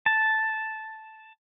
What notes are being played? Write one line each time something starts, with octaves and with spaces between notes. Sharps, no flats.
A5